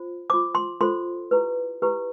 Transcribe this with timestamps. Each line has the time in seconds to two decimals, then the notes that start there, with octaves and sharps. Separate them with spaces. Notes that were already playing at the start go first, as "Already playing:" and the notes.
Already playing: F4 C5
0.30 F4 C5 D6
0.55 C6
0.81 F4 A4 C5 C6
1.31 E4 G4 B4
1.82 E4 G4 B4